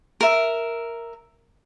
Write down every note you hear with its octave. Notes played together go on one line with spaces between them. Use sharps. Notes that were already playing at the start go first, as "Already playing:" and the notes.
A#4 E5